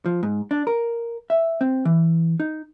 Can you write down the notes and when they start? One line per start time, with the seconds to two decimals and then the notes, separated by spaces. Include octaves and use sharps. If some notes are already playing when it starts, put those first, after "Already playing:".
0.06 F3
0.23 G#2
0.51 D4
0.67 A#4
1.30 E5
1.61 C4
1.85 E3
2.40 D#4